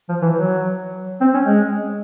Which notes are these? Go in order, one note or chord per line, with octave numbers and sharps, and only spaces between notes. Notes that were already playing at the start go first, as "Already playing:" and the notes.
F3
E3
F#3
C4
C#4
G#3